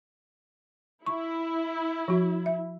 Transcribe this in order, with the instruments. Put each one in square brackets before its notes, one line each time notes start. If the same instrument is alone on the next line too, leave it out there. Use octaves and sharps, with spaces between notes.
[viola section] E4 [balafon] C#6
[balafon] F3 F#4
E5